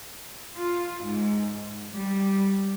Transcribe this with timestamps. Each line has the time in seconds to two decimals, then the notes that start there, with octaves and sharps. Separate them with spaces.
0.56 F4
1.04 G#2
1.93 G3